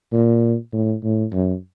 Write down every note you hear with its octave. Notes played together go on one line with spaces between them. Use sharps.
A#2
A2
A2
F#2